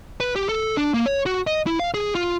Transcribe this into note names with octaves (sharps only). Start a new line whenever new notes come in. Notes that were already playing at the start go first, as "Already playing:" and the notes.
B4
G4
A4
D4
A#3
C#5
F#4
D#5
E4
F5
G#4
F4